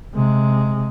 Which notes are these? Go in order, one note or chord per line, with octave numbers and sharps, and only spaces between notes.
C3 G#3